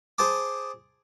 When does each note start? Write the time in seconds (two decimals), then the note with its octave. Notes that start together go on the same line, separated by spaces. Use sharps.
0.18 G#4 C5 A5 D6